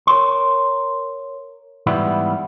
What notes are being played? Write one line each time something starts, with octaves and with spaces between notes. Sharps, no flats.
A#4 C#5 C6
G#2 E3 G3 B3 E4